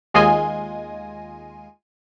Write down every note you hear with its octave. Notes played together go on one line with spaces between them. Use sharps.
D#2 G#3 F4 D#5 G#5